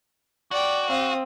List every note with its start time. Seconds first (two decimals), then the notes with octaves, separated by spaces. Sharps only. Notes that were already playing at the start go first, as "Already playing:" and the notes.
0.51 F#4 D5 G5
0.89 C4 F5 D#6